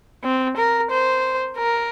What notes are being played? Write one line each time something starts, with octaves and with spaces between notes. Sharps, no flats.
C4
A#4
C5
A#4